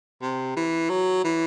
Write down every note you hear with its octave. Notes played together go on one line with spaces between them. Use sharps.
C3
E3
F#3
E3